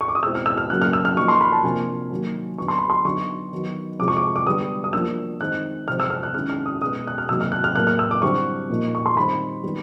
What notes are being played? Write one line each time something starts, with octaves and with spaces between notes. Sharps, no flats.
C#6
D6
D#6
B2 G#3 C4 E4 E6
F6
E6
F6
C#3 F#3 A#3 F#6
F6
E6
F6
F3 A#3 D#4 C#6
C6
B5
A5
C3 F3 A#3 D4 G#5
D#3 F#3 A#3
D3 F#3 B3 C#6
C6
B5
C6
D3 F#3 B3 D#4 C#6
D#3 F#3 B3 D#4
C3 F3 G#3 D6
C#6
D6
D6
D3 G3 B3 D#6
D#6
F3 A#3 D4 E6
D#3 G#3 C4 D#4 F#6
C3 F3 G#3 C4 F6
E6
F6
F#6
D#3 G#3 C#4 E4 F6
F6
D#6
B2 G#3 B3 D#6
F#6
F6
C3 D#3 F#3 A#3 D#4 E6
F6
F#6
F6
A2 F#3 A#3 F#6
F6
E6
D6
D3 G3 C4 E4 C#6
A#2 F3 A#3 D#4
C#6
C6
D#3 G3 C4 B5
D#3 G3 B3